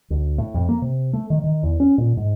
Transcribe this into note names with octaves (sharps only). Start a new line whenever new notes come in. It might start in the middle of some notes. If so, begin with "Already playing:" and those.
D2
A2
F2
A#3
C3
A3
D#3
D#3
E2
C#4
A#2
G#2